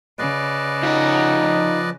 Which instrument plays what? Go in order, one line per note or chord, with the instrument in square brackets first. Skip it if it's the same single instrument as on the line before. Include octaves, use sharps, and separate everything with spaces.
[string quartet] C#3 [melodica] B4 D5 D#5
[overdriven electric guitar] F3 F#5 [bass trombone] D#4